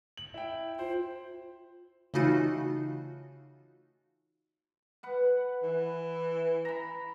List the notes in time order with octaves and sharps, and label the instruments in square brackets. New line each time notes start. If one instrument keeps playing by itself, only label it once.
[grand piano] F#7
E4 G5
[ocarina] F4 [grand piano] C5
[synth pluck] C#3 E3 A3 D#4 F4 F#4
[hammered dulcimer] B4 F#5
[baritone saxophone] E3
[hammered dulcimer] A#5 B5